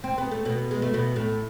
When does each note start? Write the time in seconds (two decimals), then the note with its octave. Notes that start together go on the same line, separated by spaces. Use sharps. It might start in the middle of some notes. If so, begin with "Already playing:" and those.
0.04 C4
0.18 B3
0.31 A3
0.45 B2 B3
0.71 G#3
0.82 A3
0.94 B2 B3
1.16 A2 A3